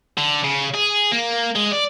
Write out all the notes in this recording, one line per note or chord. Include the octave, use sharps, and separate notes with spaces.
D3
C#3
G#4
A#3
G#3
D5